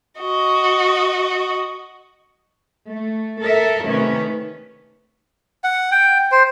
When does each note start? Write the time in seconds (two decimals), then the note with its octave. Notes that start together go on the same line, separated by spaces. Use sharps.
0.18 F#4 D#5
2.88 A3
3.42 A4 A#4 E5
3.86 C3 D#3 A3 C#4 B4
5.64 F#5
5.92 G5
6.31 C5